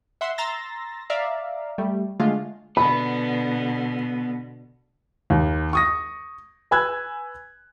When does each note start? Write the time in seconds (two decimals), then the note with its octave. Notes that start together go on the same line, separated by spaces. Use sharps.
0.21 E5 F#5 C6
0.38 A#5 C6 E6 A6 A#6
1.10 D5 E5 F5 A#5
1.78 G3 A3
2.20 D3 G#3 A3 F4
2.77 B2 D3 B3 B5
5.30 D#2
5.73 C#6 D#6 A#6
6.71 B4 G#5 B5 E6 F#6 G#6